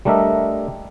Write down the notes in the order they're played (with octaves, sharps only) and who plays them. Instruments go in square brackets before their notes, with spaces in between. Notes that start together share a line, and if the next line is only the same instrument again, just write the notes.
[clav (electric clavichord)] G3 A3 D4 A#4 D#5 E5